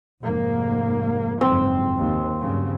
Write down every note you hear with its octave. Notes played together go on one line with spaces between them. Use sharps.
F1 G#2 A#3
F#1 F2 G#2 C4
D#2
G2 C#3 F#3